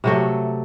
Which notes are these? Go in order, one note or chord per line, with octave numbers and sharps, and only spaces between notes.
C3 F#3 A3